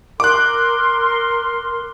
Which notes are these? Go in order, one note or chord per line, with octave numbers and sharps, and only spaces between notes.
A#4 C6 D6 F#6